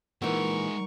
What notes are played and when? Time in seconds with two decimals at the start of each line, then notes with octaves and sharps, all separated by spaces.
0.22 A#2 E3 G#3 D#4 A#4 E5 F#5 C#6